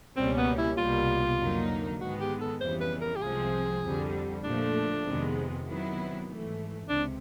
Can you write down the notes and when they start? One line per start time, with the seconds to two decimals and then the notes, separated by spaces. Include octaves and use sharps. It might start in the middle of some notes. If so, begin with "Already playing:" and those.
0.17 C#2 B2 G3 A#3 C4 C#4
0.37 B3
0.58 E4
0.77 C2 B2 G3 A#3 F4
1.39 F2 D3 F#3 A#3 D#4
1.99 G#2 D#3 G#3 B3 F#4
2.20 G4
2.41 A4
2.61 F2 C#3 E3 G3 B3 C5
2.81 B4
3.01 A#4
3.16 G4
3.22 C2 C3 F3 G#3 C4 G#4
3.83 F2 D3 G3
4.43 A#2 F3 A3 D4
5.05 F2 C3 D#3 G#3 B3
5.66 C3 D#3 F#3 B3 E4
6.27 G#2 E3 A3
6.88 C#2 C3 D4